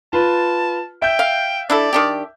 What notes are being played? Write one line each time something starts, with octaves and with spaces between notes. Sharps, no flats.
F4 B4 A5
E5 G5 G6
F5
D4 E4 A4 D5
D#3 D4 G4